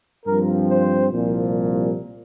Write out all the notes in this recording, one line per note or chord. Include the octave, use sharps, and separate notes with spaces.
G2 F3 C4 A#4
C5
C2 A#2 F3